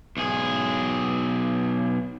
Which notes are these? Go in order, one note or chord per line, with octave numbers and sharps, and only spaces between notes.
B1 G#4